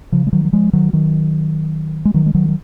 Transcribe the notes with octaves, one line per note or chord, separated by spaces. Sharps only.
C#3 F3
G#3
D#3 F#3
F#3
F3 G#3
D#3 F#3
D#3 F#3
G#3
D#3 F#3
G#3
D#3 F#3
F#3